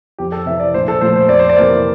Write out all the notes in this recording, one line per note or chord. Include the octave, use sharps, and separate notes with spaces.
F2 G4
A4
C3 E3 E5
D5
A#1 C5
A4
A#2 F3 A3 C5
C5
F2 D5
C5
D5
C3 E3 A#3